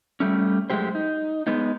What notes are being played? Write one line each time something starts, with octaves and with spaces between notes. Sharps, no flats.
G3 A3 C#4
F#2 E3 G#3 A3 G4 C5
D#4
G#3 B3 D#4